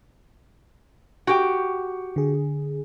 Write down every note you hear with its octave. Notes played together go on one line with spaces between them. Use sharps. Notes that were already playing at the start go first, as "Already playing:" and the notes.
F#4 G4 G5
D3 G#4